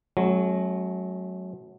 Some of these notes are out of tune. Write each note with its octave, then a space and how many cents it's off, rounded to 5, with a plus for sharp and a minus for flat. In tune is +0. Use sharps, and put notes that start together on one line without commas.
F#3 +0 A3 -45 C#4 -35